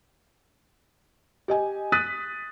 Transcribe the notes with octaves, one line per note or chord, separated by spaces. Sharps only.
G4 D#5 G#5
D#6 F#6 A6 B6 D#7